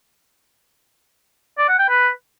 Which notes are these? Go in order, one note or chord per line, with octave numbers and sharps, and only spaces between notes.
D5
F#5
G5
B4